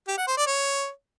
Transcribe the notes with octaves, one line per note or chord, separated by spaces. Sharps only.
G4
F#5
C5
D5
C#5